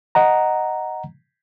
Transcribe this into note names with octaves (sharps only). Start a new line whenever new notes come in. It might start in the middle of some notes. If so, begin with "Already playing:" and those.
D#5 F#5 A#5